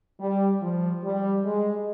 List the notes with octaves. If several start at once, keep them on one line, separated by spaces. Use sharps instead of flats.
G3
F3
G3
G#3